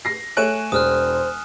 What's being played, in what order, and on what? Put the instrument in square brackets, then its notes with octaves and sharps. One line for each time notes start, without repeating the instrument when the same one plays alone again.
[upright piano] A#6 C7
[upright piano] A3 C#5 F#6 [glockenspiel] G#5 D#7 E7
[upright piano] E1 [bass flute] C5 [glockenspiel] D#6 F6 F#6